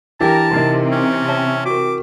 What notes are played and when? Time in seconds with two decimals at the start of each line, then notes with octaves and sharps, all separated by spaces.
0.20 E3 D4 G4 A#4 G5 A5
0.54 C3 C4 D#4 A#4 D#5
0.92 C#4
1.28 C#5 E5 A5
1.66 F#4 A#4 D6